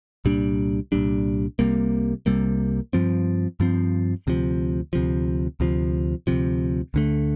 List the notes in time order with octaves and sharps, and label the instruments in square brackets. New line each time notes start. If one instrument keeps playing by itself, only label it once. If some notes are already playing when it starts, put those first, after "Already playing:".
[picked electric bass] C2 A#2 G3 D4
C2 A#2 G3 D4
C2 C3 G3 A#3
C2 C3 G3 A#3
G2 F3 C4
G2 F3 C4
D2 C3 F3
D2 C3 F3
D2 C3 F3
D2 C3 F3
D2 D3 A3